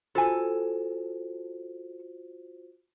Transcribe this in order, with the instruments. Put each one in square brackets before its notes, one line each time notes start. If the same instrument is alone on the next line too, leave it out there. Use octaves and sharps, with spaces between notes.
[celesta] F4 F#4 C5 [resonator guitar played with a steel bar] A4 G#5